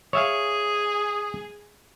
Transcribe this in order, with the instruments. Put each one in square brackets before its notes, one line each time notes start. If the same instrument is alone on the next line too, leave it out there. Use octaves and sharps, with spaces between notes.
[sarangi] G#4 [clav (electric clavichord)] C#5 E5 F5 [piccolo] D#6